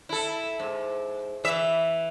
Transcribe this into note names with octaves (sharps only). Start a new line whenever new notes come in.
E4 A4
G#2
E3 E5